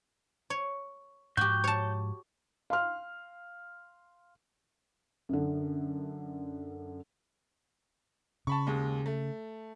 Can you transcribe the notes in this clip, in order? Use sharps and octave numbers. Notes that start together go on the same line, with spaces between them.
C#5
G#2 F3 F#4 G4 G6
C#5 A5
F5 C6 F6
F#2 D3
C#3 A5 B5 C#6
D#2 G#3
A3